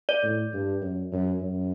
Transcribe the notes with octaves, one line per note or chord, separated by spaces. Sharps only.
D5
A2
G2
F#2
F#2
F#2